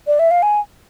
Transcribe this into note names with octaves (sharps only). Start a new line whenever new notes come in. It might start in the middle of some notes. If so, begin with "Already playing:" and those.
D5
E5
F5
G#5